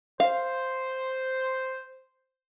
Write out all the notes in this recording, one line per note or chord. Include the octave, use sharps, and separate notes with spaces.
C5 F5